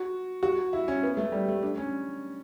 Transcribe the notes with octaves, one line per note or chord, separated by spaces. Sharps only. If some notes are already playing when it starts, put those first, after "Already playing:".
Already playing: F#4
F#4
E4
C#4
B3
A3
G3
A3
D4
C#4